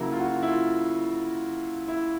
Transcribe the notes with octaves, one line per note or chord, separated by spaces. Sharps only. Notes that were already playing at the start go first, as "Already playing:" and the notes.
Already playing: C#3 F#3 A#3 E4
F4
F#4
F4
E4
F4
E4